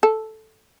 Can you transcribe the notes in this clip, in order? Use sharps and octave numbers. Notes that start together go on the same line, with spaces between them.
A4